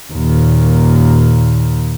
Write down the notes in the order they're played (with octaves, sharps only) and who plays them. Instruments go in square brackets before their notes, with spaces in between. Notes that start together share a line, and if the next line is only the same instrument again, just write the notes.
[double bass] D#2 A#2